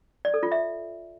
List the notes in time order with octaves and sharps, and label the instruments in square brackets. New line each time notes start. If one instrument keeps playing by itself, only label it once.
[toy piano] D5
A4
F4
E5